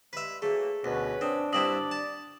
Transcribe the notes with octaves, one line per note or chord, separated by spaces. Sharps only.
G2 G#3 B4 E5
E3 F#3 A3 A#3 G#4
D2 B2 C#4 B4
C4 D4 D#6
G2 C4 E4 D5 D#6 F#7
A5